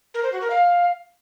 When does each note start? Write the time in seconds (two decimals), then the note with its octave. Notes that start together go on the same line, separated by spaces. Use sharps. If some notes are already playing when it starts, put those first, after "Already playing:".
0.14 A#4
0.23 C5
0.32 F#4
0.41 A#4
0.50 F5